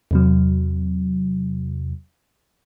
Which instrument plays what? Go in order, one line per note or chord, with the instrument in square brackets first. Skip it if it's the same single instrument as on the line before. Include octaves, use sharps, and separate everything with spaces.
[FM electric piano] E2 C3 F#3